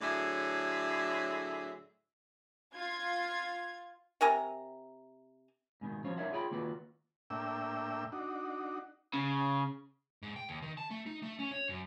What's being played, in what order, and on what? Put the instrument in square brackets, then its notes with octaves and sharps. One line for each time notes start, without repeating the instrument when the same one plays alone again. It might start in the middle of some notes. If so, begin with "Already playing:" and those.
[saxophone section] A2 D3 F#3 G#4 D5 E5
[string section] F4 G#6
[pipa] C3 A#4 G#5 A#5
[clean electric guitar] G#2 B2 D#3
F3 F#3 C#4 C5 C#5
D#4 E4 A#4 C#5 E5 F#5
F4 G#4 C#5 G5 G#5 B5
D#3 A#3 F4 F#4 B4
[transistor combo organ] A2 A#3 D4 E5 G5 E6
D4 D#4 F#4
[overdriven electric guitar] C#3
[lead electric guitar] G#2
G5
D#2
D#3
A5
A3
D#4
A3
C#4
C#5
F#2